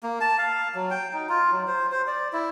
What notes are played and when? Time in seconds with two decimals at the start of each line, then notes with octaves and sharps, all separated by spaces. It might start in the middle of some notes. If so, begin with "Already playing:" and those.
0.03 A#3
0.21 A5
0.38 F5
0.75 F#3
0.90 G5
1.13 D#4
1.29 F4
1.51 F#3
1.67 C5
1.92 C5
2.07 D5
2.33 E4